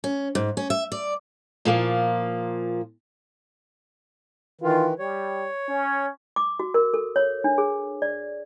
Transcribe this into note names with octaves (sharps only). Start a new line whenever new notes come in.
C#4
G#2
C#4
E5
D5
A#2 F3 A#3
D#3 E3 F4
G3 C#5
C#4
D6
F#4
A#4
A4
C#5
D4
G#4
D5